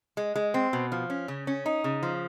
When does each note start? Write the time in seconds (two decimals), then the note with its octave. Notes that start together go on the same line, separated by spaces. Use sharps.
0.17 G#3
0.36 G#3
0.54 C4
0.73 B2
0.92 F3
1.10 C#4
1.28 C#3
1.47 C#4
1.66 D#4
1.84 C#3
2.03 F3